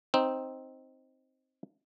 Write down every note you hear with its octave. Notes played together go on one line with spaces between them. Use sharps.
C4 D#4